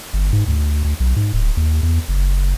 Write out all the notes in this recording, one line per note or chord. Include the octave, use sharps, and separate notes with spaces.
G1
G#2
D2
D2
B1
G#2
D1
D#2
E2
F#1